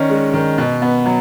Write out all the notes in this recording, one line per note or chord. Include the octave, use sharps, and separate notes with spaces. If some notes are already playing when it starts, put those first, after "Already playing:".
Already playing: D#3 C#4 D4
G#3
D#3
B2
B3
F#3